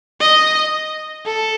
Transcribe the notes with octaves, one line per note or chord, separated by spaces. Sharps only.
D#5
A4